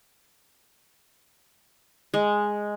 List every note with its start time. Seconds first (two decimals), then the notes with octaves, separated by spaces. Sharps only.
2.14 G#3